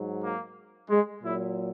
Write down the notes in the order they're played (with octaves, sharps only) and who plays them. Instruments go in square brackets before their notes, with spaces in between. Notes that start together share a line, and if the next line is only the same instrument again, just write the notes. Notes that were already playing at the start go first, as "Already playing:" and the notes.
Already playing: [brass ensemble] G#2 F#3
A#3
G#3
A#2 F#3 E4